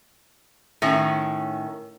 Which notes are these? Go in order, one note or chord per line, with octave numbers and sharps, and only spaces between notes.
A2 D#3 C#4